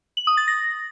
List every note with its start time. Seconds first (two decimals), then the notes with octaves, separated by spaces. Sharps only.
0.17 F#7
0.27 D#6
0.37 A6
0.48 A#6